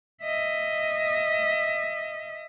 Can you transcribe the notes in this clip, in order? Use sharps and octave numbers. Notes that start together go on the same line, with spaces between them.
D#5 E5